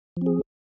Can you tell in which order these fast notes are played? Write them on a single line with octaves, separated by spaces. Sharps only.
F3 C4 G#4